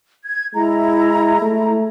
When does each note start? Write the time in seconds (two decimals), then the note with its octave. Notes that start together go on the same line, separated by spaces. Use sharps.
0.24 G#6
0.54 G#3 E4 A#5
1.42 A3